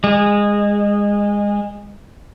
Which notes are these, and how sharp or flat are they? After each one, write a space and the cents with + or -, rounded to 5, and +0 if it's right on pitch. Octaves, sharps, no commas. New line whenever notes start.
G#3 -20